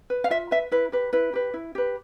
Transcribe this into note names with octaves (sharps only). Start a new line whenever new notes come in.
B4
F5
F4 E5
B4 E5
E4 B4
G4 B4
E4 B4
G4 B4
E4
G4 B4